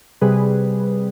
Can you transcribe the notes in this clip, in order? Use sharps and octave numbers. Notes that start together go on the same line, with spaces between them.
C3 G3 G#4 B4